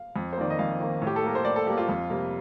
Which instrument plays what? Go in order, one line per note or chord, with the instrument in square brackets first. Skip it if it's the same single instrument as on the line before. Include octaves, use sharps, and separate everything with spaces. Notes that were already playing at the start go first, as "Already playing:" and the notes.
Already playing: [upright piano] F5
F2
C5
D#3 A#3 D5
D#5
F2 F5
D#3 A#3
A2
G4
A4
G3 A#3 A#4
C5
A2 D5
A4
G3 A#3 G4
F4
F2
C3 G3 A#3